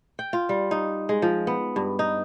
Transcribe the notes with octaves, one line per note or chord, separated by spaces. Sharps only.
G5
F4
G3
D#4
G#3
F3
B3
G2
D#4